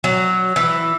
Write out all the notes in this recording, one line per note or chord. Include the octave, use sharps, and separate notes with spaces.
F#3
E3